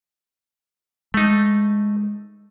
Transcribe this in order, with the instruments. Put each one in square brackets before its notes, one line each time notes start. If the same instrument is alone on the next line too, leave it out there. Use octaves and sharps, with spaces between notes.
[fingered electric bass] G#3 [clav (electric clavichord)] A3 D#4